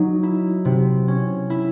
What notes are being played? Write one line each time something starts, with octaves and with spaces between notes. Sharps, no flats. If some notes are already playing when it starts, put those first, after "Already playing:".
Already playing: F#3 D#4
E4
C3
C#4
E4